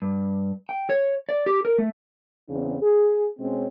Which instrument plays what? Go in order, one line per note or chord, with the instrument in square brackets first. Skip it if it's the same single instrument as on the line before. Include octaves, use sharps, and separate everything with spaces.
[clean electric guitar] G2
G5
C#5
D5
G4
A#4
A3
[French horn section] E2 C#3 C4 D4
G#4
B2 G#3 C4 C#4